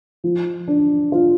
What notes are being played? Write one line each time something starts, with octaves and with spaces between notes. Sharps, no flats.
F3
D4
F4